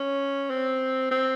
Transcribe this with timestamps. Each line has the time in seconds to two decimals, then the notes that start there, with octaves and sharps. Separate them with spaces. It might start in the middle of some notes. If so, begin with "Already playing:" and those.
Already playing: C#4
0.50 C4
1.11 C4